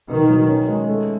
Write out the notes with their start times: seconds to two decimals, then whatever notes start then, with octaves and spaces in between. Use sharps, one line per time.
0.09 B2 D#3
0.29 F#3
0.48 C#4
0.68 G#3
0.88 A3